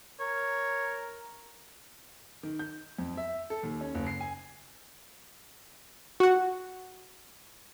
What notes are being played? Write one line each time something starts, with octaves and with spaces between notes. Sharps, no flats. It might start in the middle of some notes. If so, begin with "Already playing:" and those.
A#4 C#5
D#3
G6
F2
E5
A4
D#2
C#4
F#1
C7
G#5
F#4 F#5